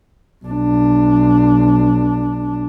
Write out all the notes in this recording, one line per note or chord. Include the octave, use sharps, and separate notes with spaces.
B1 D4